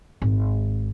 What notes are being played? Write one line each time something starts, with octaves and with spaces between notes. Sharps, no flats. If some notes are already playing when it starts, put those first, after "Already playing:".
G#1